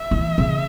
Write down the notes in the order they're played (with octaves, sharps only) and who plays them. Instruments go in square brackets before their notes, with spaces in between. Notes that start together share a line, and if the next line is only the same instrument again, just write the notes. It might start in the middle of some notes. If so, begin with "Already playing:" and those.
Already playing: [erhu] E5
[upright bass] E3
C#3